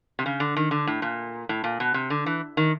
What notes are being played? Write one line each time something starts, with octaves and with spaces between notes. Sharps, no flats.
C3
C#3
D3
D#3
D3
A2
A#2
A2
A#2
B2
C3
D3
E3
D#3